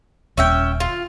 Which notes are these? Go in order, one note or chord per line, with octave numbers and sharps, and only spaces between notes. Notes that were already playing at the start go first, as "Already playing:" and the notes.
D#1 C#4 E5 G5
F4